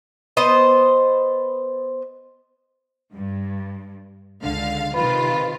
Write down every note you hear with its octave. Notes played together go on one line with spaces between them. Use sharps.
B3 C5 D#5
G2
C#2 D3 F5
C3 D#3 F4 B4